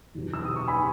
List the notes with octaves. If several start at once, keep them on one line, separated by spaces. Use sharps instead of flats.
E2 B2 F#3
E6
D#6
C#6
G#5 B5